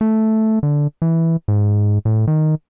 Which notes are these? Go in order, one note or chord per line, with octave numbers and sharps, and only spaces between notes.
A3
D3
E3
G#2
A2
D#3